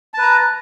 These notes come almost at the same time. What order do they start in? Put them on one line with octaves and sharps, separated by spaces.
A5 B4 A#5